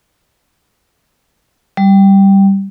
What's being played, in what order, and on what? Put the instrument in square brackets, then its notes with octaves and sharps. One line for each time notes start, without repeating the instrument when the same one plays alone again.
[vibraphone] G3